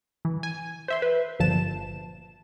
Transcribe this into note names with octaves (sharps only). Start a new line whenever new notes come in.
E3
G#5
C5 E5 C6
B4
G1 A#2 F3 A5 E7